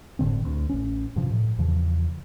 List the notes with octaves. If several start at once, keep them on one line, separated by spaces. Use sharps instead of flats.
G1 A2 D3 C4
D2
A1 C#4
G2 C3 F3
A2
E2 C#3 F3